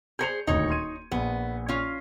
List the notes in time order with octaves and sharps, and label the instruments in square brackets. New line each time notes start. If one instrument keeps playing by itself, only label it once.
[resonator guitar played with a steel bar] G#4 A#4 C5 [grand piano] G6 C#7 F7
[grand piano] D#1 D2 D#3 [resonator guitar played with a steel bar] D#4 C#5
[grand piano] C6 G#6 D#7
[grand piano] A#1 [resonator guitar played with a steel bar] B3
[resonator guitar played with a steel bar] C#4 F4